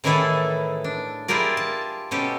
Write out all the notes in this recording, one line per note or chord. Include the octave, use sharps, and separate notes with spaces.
A2 D#3 E3 E4 G#4 A4
D4
E4 F4 G4 G#4 A#4 D5
A5
B2 C#4 G4 A4